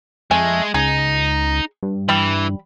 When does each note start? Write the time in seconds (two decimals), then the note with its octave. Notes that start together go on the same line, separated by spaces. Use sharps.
0.31 F2 G#3 A3 G#5
0.74 C#2 D#4 G#4
1.83 G2
2.09 E3 G3 B5